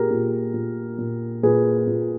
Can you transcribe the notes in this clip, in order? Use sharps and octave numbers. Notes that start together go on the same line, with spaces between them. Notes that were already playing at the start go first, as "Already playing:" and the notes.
Already playing: A#2 G4 G#4 A#4
A#2
A#2
A#2
A#2 G#4 B4
A#2